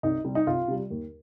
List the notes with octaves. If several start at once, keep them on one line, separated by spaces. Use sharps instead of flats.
C2 D#4
C3 G3
D#4
C2 F4
C3 G3
D#2